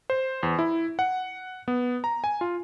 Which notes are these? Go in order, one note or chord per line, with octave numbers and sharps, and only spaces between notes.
C5
E2
E4
F#5
B3
A#5
G#5
F4